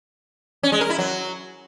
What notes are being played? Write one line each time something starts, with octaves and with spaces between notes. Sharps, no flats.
C#4
G#3
A#4
E4
F#3